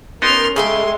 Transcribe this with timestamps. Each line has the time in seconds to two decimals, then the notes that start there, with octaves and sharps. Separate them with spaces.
0.22 B3 C#4 D#4 G4 A#4 C6 F6
0.56 C#3 G#3 G#4 A4 E5 G5 C6